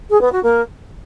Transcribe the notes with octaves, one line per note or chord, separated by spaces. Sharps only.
G#4
B3
F#4
A#3